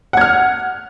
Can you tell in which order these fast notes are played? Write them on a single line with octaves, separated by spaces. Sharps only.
F#5 G#6 F6